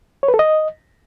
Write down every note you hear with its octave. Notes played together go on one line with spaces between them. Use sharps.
C#5
B4
A4
D#5